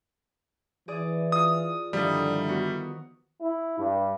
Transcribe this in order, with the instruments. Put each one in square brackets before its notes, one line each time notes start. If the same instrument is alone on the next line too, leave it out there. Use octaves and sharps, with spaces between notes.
[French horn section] E3 [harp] G#4 D5 D#6
[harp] F4 [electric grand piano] D#6
[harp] G2 D#3 F3 [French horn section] D3 E4 [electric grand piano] G3
[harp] B3 F#4
[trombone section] E4
G2